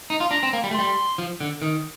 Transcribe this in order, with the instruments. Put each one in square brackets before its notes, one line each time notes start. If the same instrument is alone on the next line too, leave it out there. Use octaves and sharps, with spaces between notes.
[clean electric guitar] D#4
F4
[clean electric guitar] D4 [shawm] A#5
[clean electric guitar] C4
A#3
G3
A3
[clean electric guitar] G3 [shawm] C6
[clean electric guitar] F3
D3
D#3